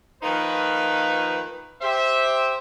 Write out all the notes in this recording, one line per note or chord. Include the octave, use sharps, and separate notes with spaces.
D#3 F3 A#3 D#4 B4
G4 C5 E5